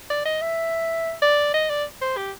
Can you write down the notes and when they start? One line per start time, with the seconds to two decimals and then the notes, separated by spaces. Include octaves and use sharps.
0.10 D5
0.25 D#5
0.42 E5
1.22 D5
1.54 D#5
1.70 D5
2.01 C5
2.17 G4